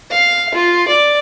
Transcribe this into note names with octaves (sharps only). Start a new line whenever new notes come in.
F5
F4
D5